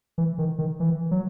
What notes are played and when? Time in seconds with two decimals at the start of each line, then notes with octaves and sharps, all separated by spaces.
0.18 E3
0.38 D#3
0.59 D#3
0.80 E3
1.11 F#3